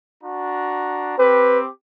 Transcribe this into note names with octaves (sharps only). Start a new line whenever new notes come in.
D4 F#4 A#5
C4 G4 B4 D6